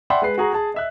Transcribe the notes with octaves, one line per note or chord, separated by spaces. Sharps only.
D5 E5 F#5 G5 B5 C6
G#3 B4 C7
F#4 G#4 A#5
G#4 A5
D#5 E5 F#6